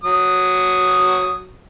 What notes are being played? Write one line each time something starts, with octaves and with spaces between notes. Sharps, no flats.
F#3 D#6